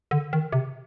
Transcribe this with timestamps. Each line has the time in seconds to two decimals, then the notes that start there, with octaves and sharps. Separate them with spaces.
0.11 D3
0.33 D#3
0.52 C3